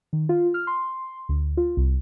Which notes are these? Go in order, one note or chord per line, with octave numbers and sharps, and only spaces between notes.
D#3
F4
F6
C6
D2
F4
C2